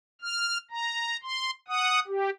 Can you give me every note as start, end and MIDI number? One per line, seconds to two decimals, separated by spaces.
0.21 0.58 89
0.71 1.16 82
1.23 1.51 84
1.68 2.00 78
1.68 2.00 87
2.07 2.30 67